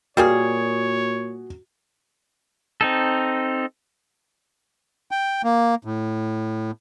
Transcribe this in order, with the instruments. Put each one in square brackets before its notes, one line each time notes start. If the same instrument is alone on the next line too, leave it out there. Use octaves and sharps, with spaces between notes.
[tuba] A#2 [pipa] G3 A#3 G#4 [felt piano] F#4 [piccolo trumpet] C#5
[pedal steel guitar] C4 D#4 A4
[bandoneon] G5
A#3
A2